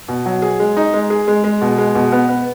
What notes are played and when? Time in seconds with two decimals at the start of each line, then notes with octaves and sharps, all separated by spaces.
0.08 B2
0.26 F#3
0.42 G#4
0.60 G#3
0.77 D#4
0.94 G#3
1.10 G#4
1.28 G#3
1.44 G#3
1.62 B2
1.78 G#3
1.95 B2
2.12 B3
2.29 B3